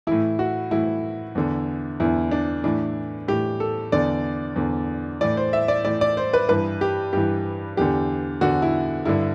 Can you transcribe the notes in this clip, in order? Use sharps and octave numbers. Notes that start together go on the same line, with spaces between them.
A2 E3 E4
F#4
A2 E3 E4
E2 D3
E2 D3 E4
D4
A2 E3 D4
A2 E3 G4
A4
E2 D3 D5
E2 D3
A2 E3 D5
C5
E5
D5
A2 E3 D5
D5
C5
B4
G2 E3 B4
G4
G2 E3 G4
E2 D3 G4
E2 D3 F#4
E4
G2 D3 E4